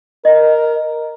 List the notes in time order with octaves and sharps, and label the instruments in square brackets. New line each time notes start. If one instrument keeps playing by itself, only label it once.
[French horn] A#4 [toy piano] D#5